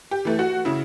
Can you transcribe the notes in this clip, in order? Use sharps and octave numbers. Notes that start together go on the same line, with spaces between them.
G4
E3 A3
F#4
C#3 E4